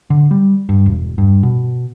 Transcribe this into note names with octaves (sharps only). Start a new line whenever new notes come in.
D3
G3
G2
E1
G2
B2